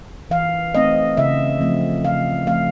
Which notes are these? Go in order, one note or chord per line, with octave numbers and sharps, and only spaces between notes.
E3 F5
A3 C4 D#5
C#3 E5
F3 A3 C4
C#3 F5
F3 A3 C4 F5